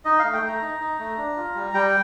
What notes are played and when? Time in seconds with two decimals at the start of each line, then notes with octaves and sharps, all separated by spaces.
0.05 D#4 D#5
0.19 F5
0.24 A3
0.33 G5
0.43 A3 A#5
0.61 D#4
0.80 D#4
0.99 A3
1.18 D4
1.37 F4
1.55 G3
1.73 G3 G5